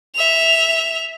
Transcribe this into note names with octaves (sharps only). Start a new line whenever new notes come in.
E5 F7